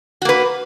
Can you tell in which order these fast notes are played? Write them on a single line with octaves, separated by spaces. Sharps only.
F#4 A#3 B4